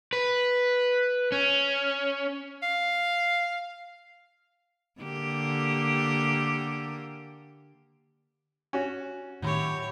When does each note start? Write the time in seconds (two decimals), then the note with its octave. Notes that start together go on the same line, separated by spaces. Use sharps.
0.13 B4
1.32 C#4
2.63 F5
5.01 D3 A#3 G4
8.73 C#4 F#4
9.42 A2 D#3 F#3 E4 G4 C#5